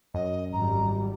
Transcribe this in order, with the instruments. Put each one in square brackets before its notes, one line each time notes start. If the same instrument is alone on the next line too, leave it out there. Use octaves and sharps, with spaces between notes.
[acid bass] F#2 [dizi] D#5
[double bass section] G#1 G3 [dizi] A#5